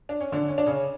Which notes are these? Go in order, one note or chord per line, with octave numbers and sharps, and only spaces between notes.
D4
C#4
D3 D4
C#4
D4
C#3 C#4